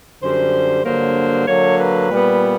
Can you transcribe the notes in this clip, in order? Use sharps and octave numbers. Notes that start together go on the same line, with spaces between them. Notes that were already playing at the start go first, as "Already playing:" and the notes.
F#2 D3 G3 C5
G2 D3 F#3 A#3 C5
D3 F#3 A#3 C#5
B4
A#2 G3 B3